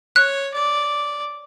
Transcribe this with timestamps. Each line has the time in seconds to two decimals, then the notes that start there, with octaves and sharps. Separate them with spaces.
0.16 C#5 F#6
0.54 D5